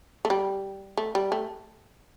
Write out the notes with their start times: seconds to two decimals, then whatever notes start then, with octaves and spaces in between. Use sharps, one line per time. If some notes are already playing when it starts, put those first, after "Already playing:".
0.25 A3
0.30 G3
0.97 A3
1.15 G3
1.32 A3